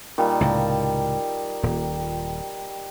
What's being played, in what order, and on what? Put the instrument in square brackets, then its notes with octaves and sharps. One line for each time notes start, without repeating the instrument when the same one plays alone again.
[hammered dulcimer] A#2 D#3 G3
[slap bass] C#2 A2 C3 [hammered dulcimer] A5 A#5
[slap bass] D#1 A#2